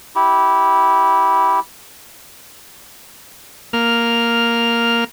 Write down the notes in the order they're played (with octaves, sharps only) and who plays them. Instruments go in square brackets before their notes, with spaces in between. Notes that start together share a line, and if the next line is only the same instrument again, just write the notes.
[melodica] E4 G4
[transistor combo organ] A#3 F6